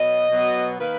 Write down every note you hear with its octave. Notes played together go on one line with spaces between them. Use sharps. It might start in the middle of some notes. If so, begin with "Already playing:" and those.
Already playing: B2 F#3 B3 D#5
B2 F#3 B3
D#3 A#3 B4